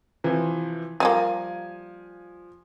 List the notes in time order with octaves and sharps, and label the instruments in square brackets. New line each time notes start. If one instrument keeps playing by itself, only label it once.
[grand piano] C3 E3 F3
[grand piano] F3 G#5 [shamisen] G3 G#3 A#3